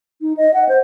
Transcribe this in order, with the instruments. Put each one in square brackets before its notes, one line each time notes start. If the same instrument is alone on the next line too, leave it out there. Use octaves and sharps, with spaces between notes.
[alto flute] D#4
D#5
F#5
C5